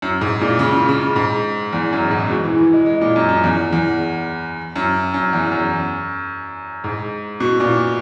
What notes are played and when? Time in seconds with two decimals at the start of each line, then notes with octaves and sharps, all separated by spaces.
0.02 F#2
0.21 G#2
0.41 A#2
0.59 C#3
0.89 C#3
1.16 G#2
1.73 E2
1.93 F#2
2.11 G#2
2.29 B2
2.44 E3
2.59 E3
2.73 G#3
2.86 G#3
3.01 A#2
3.16 F#2
3.29 F#2
3.44 E2
3.73 E2
4.76 F#2
5.14 F#2
5.33 E2
5.52 F#2
6.84 G#2
7.40 B2
7.60 A#2